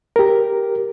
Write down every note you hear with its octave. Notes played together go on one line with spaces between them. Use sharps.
G4 A#4